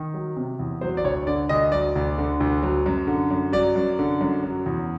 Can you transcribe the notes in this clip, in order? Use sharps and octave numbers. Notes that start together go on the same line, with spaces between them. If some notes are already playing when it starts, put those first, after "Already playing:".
Already playing: D#3
F#3
C3
E2
F#3 C5
D5
D2 C#5
D3 D5
D2 D#5
F#3 D5
D2
D3
D2
F#3
F#2
D3
F#2
F#3 D5
F#2
D3
F#2
F#3
E2